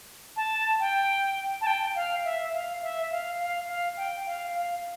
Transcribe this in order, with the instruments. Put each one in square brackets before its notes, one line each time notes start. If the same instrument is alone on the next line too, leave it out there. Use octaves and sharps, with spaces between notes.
[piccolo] A5
G5
A5
G5
F5
E5
F5
E5
F5
F5
F5
G5
F5
F5